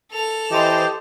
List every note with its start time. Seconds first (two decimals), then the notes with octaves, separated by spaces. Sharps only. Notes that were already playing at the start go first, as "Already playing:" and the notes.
0.11 A4 F7
0.51 E3 G4 C5 D#5 A5